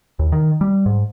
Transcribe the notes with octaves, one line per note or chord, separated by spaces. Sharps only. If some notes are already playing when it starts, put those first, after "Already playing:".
D#2
D#3
G3
G#2